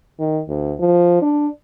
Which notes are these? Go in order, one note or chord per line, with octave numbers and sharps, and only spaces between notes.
D#3
D2
F3
D4